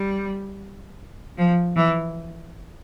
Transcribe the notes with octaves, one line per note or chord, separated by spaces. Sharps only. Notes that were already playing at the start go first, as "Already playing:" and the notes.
Already playing: G3
F3
E3